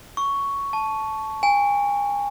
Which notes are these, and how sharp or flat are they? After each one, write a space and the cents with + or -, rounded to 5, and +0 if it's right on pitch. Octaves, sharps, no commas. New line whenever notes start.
C#6 +5
A5 -15
G#5 -35